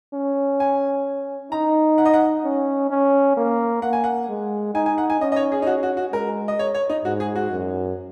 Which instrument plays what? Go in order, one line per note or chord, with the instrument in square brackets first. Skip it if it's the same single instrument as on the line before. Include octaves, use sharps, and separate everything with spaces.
[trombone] C#4
[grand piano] G#5
[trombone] D#4 [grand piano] A#5
[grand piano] F#5
D#5
F#5
[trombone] C#4
C#4
A#3
[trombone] A#3 [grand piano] F#5
[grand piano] G#5
F#5
[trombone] G#3
[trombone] D#4 [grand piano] G#5
[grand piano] G#5
F#5
G#5
[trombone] C#4 [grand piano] D#5
[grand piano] D#5
C#5
G#4
D#4
F#4
F#4
F#4
[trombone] G#3 [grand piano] A#4
[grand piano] D#5
C#5
C#5
D#4
[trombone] G#2 [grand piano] F#4
[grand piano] G#4
F#4
[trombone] F#2